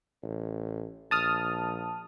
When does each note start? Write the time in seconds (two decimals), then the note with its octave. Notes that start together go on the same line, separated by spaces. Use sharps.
0.23 A1
1.11 A#1 A5 D#6 F6